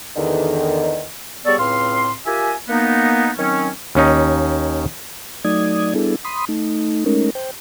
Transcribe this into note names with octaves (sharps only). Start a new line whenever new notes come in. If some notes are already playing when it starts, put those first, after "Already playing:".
E2 D3 D#3
G3 B3 G#4 A4 C#5 D5
C#2 A2 C4 F5 C6
F4 G4 A#4 E5 G#5
A#3 B3 D#4
D#3 F#3 C4 C#4
D#2 C#4 D#4
F#3 A3 D#4 D5 D#6 G#6
G3 B3 D4 E4 G#4 A4
B5 C6 D#6
A3 D#4
G#3 A3 C#4 D#4 A#4
C5 G5